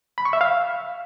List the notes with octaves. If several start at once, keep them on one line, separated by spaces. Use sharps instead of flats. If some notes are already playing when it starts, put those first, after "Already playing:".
B5
C#6
E5
F5